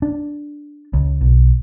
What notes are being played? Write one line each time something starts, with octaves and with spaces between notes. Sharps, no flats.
D4
C#2
B1